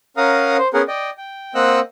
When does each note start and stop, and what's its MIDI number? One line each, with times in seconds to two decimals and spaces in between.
0.17 0.57 61
0.17 0.57 70
0.17 0.57 77
0.17 0.57 78
0.17 0.57 82
0.17 0.57 87
0.58 0.68 72
0.74 0.82 59
0.74 0.82 61
0.74 0.82 68
0.74 0.82 70
0.74 0.82 78
0.88 1.10 74
0.88 1.10 75
0.88 1.10 79
1.18 1.54 79
1.55 1.80 58
1.55 1.80 60
1.55 1.80 75
1.55 1.80 78
1.55 1.80 88
1.55 1.80 90